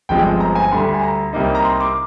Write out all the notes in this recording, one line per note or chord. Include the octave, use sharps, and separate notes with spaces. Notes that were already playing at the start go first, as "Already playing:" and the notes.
G1 G2 F3 G#3 C4 G5
A#5
G#5
D2 D3 G3 C6
G#5
A#5
C2 C3 G3 A#3 D#4
A#5
C6
D6